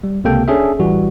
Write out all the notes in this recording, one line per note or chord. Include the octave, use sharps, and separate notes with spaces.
G3
C#2 C3 A#3 A4 G5
C#4 D4 G#4 A4 E5
A1 E3 G3 F#4